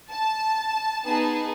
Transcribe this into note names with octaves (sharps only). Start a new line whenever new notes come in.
A5
B3 D#4 G#4 A5